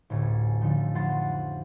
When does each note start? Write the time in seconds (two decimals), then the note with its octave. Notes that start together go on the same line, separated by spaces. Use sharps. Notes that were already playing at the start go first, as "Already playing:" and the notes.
0.10 A1 D2 A2 G#5
0.61 D3 F3 A3 D#4
0.95 F2 B3 F#5 C6 F#6 A6